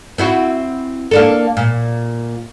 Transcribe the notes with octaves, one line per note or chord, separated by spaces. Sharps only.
C4 E4 F#4
A#3 D4 A4
A#2